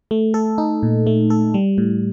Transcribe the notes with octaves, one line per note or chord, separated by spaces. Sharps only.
A3
A4
D#4
A#2
A3
A4
G3
A2